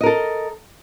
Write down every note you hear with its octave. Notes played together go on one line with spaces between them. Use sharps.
A4 A#4 D#5